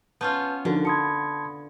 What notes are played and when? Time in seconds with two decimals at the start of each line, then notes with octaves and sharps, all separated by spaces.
0.21 B3 C#4 F4 B4 A5 G6
0.65 D3 F3 D#4 F#4 A#4
0.85 A5 B5 C6 D#6 G#6 C#7